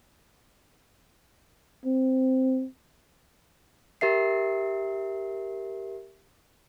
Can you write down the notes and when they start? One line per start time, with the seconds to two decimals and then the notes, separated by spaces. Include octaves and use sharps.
1.85 C4
4.01 G4 A#4 E5 C7